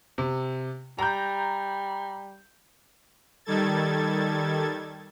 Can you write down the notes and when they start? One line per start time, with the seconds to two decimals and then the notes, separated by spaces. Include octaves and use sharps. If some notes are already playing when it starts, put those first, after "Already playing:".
0.18 C3
0.99 G3 A#5 G6
3.45 D#3 G3 A4 G#6 A6